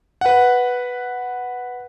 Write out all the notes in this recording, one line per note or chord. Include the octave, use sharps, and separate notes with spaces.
B4 F#5